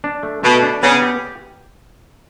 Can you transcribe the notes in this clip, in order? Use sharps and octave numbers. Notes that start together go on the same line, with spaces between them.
D4
A3
B2 A3
D4
C#3 B3
G4